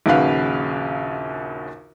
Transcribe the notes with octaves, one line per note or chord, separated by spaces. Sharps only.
A#1 D#2 C#3 F#4 B4 F5